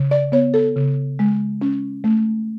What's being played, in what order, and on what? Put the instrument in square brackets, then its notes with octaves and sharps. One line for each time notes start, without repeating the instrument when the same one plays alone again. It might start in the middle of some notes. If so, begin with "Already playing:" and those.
Already playing: [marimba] C#3
D5
B3 C#5
A4
C#3
G#3
C#4
A3